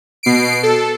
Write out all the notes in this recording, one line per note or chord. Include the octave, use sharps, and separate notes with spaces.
B2 C7 D7
A4